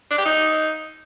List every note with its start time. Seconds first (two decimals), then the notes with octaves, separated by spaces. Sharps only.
0.11 D4
0.18 G4
0.26 D#4